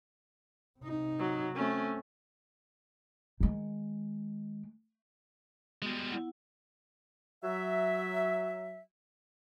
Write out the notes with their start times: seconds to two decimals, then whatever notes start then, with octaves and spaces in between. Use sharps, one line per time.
0.79 C3 D#4
1.19 F#3
1.55 A3 C4 C#4
3.40 D#3 G#3
5.82 G3 G#3 B3 F#4
6.10 B3 E4 F#5
7.44 F#3 E5